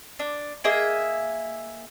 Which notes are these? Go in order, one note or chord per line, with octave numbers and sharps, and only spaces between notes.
D4
A#3 G#4 D#5 E5